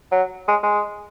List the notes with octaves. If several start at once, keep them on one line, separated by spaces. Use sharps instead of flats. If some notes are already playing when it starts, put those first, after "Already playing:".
F#3
G#3
G#3